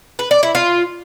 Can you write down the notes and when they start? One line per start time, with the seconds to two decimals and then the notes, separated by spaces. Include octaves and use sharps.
0.19 B4
0.31 D5
0.43 E4
0.55 F4